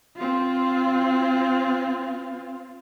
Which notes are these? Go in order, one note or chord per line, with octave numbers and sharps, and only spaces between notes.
C4 F4